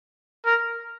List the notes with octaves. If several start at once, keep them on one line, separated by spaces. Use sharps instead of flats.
A#4